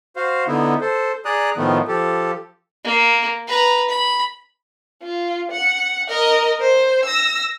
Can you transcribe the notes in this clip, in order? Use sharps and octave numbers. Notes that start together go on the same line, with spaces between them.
F#4 C5 F5
D3 B3 D#4 E4
A4 C5
G#4 D5 A#5 D#6 F#6
A2 D#3 F3 A3 B3 D#4
F3 G4 A4
A#3
B4 A#5
B5
F4
F#5
A#4 D#5
C5
E6 A#6